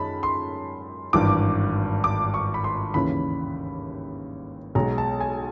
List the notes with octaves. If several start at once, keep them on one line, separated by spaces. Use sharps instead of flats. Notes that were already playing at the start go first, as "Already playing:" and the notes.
Already playing: F#2 D#3 G#3 A5 B5
C6
G#1 G2 E3 D6
D6
C#6
B5
C6
D#2 C#3 E3 B5
B1 B2 G#3 A#5
A5
G#5